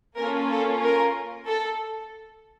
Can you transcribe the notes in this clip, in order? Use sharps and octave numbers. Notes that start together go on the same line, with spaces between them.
A#3 C#4 F4 A4 A#4
A4
A#4
A4